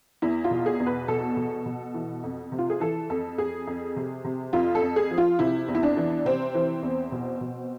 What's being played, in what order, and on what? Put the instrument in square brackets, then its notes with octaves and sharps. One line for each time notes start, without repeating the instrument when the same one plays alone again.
[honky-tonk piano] E2 E4
F4
B2
G#4
E2
B4
B2 A4
B2
B2
E3
F2
C3
F4
G#4
E3 A4
F2 A4
F2 G#4
F2
C3
C3
F2 F4
A4
F2
G#4
F3
F4
C3 E4
E2
E4
D4
E3
C3 C4
E3
E2
B2
B2